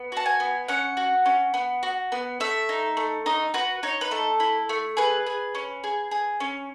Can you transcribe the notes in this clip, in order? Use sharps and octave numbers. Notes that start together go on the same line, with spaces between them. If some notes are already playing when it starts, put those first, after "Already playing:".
Already playing: B3
F#4 A5
G#5
B3
C#4 F#5
F#4
C#4
B3
F#4
B3
A3 E5
D#4
A3
D#4 D#5
F#4 B4
D#4 C#5
B4
A3 A4
E4
A3
G#4 B4
G#4
C#4
G#4
G#4
C#4